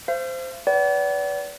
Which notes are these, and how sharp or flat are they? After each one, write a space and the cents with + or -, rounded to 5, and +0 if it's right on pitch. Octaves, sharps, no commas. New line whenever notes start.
C5 -10 F5 -45
B4 +0 D5 -40 F#5 +45